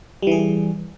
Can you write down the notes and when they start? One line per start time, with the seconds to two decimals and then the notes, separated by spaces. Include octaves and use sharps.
0.22 G3
0.27 E3
0.32 G#4